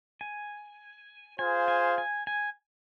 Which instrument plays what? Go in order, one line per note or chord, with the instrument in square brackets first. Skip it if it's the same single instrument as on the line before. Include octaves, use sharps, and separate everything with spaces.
[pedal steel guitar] G#5
[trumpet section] F4 G#4 C5 F5 [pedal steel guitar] G#5
[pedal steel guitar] G#5
G#5
G#5